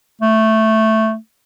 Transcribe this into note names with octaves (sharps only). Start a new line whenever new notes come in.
A3